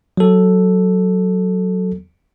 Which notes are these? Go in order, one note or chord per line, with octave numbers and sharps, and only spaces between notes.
F#3 A4